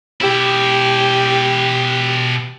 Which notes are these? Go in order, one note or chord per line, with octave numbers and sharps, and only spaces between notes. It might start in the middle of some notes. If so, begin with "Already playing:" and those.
B2 E4 G4